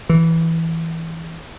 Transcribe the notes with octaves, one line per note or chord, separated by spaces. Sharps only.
E3